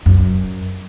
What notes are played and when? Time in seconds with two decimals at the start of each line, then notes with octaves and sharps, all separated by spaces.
0.06 F#2